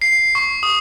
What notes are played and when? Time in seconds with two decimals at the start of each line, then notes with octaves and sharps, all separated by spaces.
0.02 C7
0.35 C#6
0.63 D#6